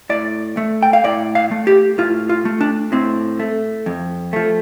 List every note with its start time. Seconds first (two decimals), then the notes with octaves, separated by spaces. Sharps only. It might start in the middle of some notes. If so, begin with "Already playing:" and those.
0.09 A2 D5
0.57 A3
0.83 G5
0.93 F5
1.04 A2 D5
1.35 F5
1.51 A3
1.67 G4
1.98 A2 F4
2.29 F4
2.45 A3
2.61 D4
2.92 A2 C4
3.39 A3
3.86 F2
4.33 F3 A3